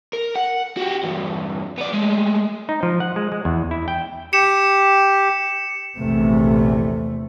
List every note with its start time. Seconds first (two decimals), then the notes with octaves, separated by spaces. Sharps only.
0.13 A#4
0.36 F#5
0.77 F#4 G4
1.03 E2 G2
1.78 B3 D5
1.94 G#3 A3
2.69 D#4
2.83 F3
3.00 F#5
3.16 G#3
3.32 G#3
3.45 E2
3.71 E4
3.88 G5
4.33 G4 C#7 E7
5.98 A#1 E2 C3 A3